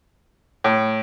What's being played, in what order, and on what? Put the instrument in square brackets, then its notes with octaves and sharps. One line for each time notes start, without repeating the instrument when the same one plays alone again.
[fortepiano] A2